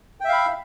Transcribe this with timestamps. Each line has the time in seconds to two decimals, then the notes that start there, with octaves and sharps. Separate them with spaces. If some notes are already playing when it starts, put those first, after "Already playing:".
0.20 G5
0.24 E5
0.29 F5
0.33 B5